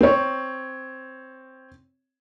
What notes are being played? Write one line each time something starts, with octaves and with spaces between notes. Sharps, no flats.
C4 C#5